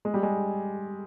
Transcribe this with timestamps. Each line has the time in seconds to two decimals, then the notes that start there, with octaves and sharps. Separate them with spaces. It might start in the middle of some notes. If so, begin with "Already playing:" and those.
0.05 G#3
0.14 G3
0.23 G#3